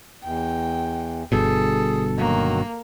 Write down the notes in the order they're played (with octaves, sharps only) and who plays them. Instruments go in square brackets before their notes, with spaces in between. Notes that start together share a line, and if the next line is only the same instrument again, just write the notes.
[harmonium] E2 [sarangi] G5
[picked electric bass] G1 G2 B2 [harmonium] G#4 [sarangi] A4
[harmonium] D#3 F#3 F#4 [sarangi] A#3